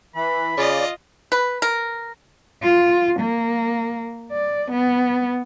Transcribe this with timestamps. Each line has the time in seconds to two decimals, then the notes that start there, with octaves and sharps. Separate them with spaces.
0.15 E3 B5
0.57 C#3 F4 D5 D#5
1.32 B4
1.62 A#4
2.62 F4
3.19 A#3
4.32 D5
4.71 B3